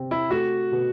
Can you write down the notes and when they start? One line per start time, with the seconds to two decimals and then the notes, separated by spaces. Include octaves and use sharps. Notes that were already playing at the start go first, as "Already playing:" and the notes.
Already playing: C3 C4
0.11 E4
0.31 A3 F#4
0.72 B2